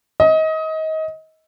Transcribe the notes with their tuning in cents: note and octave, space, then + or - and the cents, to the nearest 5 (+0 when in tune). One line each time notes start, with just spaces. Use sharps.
D#5 +25